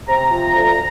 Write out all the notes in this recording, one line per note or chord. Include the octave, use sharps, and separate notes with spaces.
C3 A#5
F3
D2